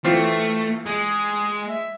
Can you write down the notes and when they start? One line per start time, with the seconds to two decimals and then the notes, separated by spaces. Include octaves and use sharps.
0.05 E3 A3 C4 F4
0.86 G#3 G#4
1.69 E5